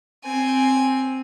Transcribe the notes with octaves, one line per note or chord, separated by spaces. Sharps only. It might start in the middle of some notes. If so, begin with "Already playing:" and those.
C4 G#5